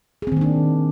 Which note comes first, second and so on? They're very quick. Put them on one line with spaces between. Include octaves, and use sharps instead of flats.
G#4 C4 D#3 A#3 D4